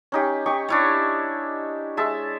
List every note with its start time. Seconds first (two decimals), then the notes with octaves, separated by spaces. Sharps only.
0.12 C#4 D#4 G4
0.46 D#4 G4 C#6
0.69 D4 E4 C#5
1.97 G#3 E5 A5